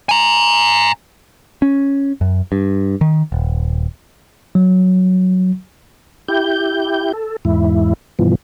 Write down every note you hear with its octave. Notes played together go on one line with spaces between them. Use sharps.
G#5 A#5
C#4
F#2
G2
D#3
D#1
F#3
E4 G4 G6
A4
E2 G#2 E4
G2 B2 E3 F3